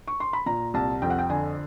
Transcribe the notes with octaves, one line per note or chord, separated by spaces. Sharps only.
C#6
C6
B5
A#2 A#5
C2 A5
F2 G5
F#5
G5
D3 G#5